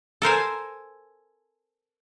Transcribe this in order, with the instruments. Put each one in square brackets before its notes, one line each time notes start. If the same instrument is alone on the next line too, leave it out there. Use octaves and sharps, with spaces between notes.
[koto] A4 A#4 C5 G#5